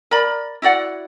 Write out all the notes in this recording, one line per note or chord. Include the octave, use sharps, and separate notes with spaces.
A#4 D5 B5
E4 F#4 D5 F#5